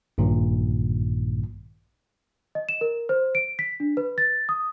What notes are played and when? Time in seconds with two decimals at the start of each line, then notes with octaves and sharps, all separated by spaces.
0.18 A#1 G2 A#2 D#3
2.55 D#5
2.69 E7
2.81 A#4
3.09 C5
3.35 D7
3.59 B6
3.80 D4
3.97 B4
4.18 A6
4.49 D#6